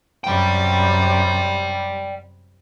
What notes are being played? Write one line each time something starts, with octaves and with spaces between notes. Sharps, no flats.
F#2 C3 G3 D5 G5